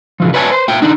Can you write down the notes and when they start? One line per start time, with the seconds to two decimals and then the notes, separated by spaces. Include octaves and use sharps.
0.20 C#3 E3 F3
0.34 B4 C#5 D5 E5 G#5 A5
0.50 B4 C5
0.68 A#3 E5 G5
0.82 D3 D4 D#4